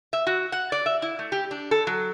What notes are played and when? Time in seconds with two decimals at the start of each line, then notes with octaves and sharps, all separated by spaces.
0.13 E5
0.27 F#4
0.52 F#5
0.72 D5
0.86 E5
1.02 E4
1.19 A3
1.32 G4
1.51 D4
1.71 A4
1.87 F#3